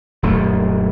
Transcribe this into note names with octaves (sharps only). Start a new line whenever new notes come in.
D#1 F#2 A3